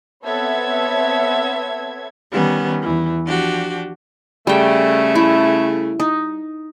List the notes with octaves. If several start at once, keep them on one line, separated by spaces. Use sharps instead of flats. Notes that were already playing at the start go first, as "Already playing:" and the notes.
B3 C4 A4 C#5 E5 G#6
D#3 G3 B3 C#4
E2 E3
F3 D4 F#4 G4
C#3 G3 A3 G5
E4
D#4